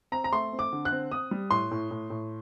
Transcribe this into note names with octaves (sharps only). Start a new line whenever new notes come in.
C4 A#5
A#5
A3 C6
C4
D6
D3
F#6
C4
C4 D#6
G3
A2 C6
A2
A2
A2